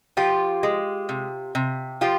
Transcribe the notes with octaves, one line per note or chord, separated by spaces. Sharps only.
F3 F4 G4
G#3
C3
C3
F3 F4 G4